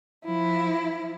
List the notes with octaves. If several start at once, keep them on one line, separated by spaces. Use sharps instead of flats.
F3 E4